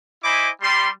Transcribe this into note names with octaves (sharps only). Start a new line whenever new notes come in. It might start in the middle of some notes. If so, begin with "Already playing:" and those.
E4 C5 D#5 G#5 B5 D6
G3 C6